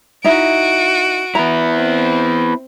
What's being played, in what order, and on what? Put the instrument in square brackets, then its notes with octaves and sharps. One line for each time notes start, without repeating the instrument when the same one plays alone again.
[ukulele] D#4 E4 E5 [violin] F#4 D7
[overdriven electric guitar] B3 E4 [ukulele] A#5
[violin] C4